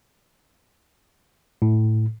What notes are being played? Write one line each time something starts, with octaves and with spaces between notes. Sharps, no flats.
A2